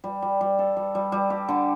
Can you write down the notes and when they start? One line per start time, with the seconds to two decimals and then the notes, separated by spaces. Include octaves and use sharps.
0.04 G3
0.22 G3
0.41 G3
0.59 A4
0.77 G3
0.95 G3
1.12 G3
1.30 G4
1.49 D3